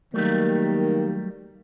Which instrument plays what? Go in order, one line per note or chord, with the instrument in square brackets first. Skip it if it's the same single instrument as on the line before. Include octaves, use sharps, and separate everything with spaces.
[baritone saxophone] D#3 [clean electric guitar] F#3 G3 A3 [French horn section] A#3 G4